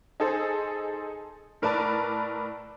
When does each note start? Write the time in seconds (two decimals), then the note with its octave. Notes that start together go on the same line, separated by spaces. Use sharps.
0.20 D#4 G#4 A4 C5
1.62 A2 A#4 B4 D5 A5